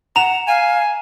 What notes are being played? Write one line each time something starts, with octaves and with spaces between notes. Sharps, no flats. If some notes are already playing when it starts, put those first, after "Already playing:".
F#5 A#5 E7 F7
F5 G#5